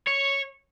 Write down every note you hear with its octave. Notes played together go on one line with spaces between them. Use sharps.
C#5